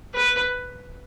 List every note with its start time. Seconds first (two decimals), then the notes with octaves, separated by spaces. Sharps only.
0.14 B4